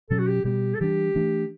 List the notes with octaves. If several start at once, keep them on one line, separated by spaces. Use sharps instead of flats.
B2 F#3 C#4 A4
F#4
G4
B2 G3 B3 G4
A4
E3 G3 D4 G4
E3 A3 D4